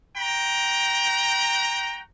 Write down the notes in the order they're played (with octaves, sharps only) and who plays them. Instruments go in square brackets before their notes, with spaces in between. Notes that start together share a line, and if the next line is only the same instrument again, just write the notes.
[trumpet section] F#4 G5 A#5